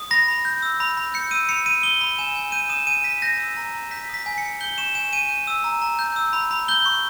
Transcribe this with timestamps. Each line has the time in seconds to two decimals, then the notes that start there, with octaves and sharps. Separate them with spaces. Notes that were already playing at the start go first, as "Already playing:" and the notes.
Already playing: D#6
0.11 B5 A#6
0.28 B5
0.45 G6
0.62 E6
0.80 B5
0.97 B5
1.14 G6 C#7
1.31 E6 D#7
1.49 B5 C#7
1.66 B5 D#7
1.83 D#6 G7
2.01 B5
2.19 G#5 E7
2.36 G#5
2.52 G6 D#7
2.69 D#6 E7
2.87 G#5 D#7
3.04 G#5 B6
3.22 G6 A#6
3.40 E6
3.57 A#5
3.74 A#5
3.91 G6 B6
4.09 D#6 B6
4.26 G#5
4.38 C#7
4.43 G#5
4.61 G6 G7
4.78 C#6 E7
4.95 G#5 E7
5.13 G#5 D#7
5.29 G6
5.47 E6
5.64 A#5
5.82 A#5
5.99 G6
6.16 E6
6.33 B5
6.51 B5
6.68 G6 G7
6.86 C#6